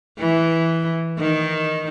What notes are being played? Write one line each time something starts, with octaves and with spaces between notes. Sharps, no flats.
E3
D#3